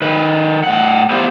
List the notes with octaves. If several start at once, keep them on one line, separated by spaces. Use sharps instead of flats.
D#3 B4
A2 F#5
B3 E4 F4 G4 C5